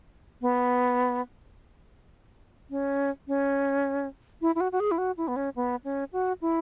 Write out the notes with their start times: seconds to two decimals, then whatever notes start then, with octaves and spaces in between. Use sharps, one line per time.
0.41 B3
2.70 C#4
3.28 C#4
4.41 E4
4.55 E4
4.60 F#4
4.72 F#4
4.80 G#4
4.91 E4
4.98 F#4
5.17 E4
5.28 B3
5.36 C#4
5.56 B3
5.84 C#4
6.13 F#4
6.41 E4